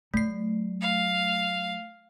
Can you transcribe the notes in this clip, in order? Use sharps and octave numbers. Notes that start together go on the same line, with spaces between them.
F#3 A3 C7
F5